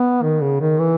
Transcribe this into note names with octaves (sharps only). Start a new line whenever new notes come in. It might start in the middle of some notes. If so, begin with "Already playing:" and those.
Already playing: B3
D#3
C#3
D#3
E3